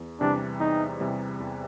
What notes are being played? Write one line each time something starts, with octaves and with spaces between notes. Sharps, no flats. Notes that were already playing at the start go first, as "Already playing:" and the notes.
Already playing: E2
C3 E3 G3 D4
E2 D#4
C3 E3 G3
E2